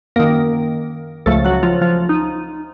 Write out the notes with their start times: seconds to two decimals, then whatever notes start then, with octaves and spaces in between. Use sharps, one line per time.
0.16 F#2 D#3 A#3 A#4
1.26 C#2 C#3 F3 A3 A4
1.45 F#3 F#4
1.63 F3 F4
1.81 F3 F4
2.09 D#4